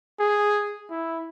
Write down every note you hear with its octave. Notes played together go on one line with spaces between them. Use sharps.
G#4
E4